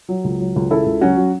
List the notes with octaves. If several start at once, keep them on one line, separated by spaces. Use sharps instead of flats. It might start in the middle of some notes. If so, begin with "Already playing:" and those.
F#3
C#2
F#3
C#2
C#3 E4 A4
C#2
F#3 C#4 F#4
F#3